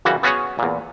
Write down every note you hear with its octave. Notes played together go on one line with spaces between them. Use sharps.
F#2 C#3 E3 G3 F#4
B3 C#4 F#4 G#4 C#5
E2 A#2